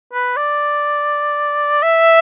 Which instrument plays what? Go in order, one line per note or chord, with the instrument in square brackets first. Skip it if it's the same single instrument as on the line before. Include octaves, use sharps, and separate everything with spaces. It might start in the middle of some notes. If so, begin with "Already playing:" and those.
[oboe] B4
D5
E5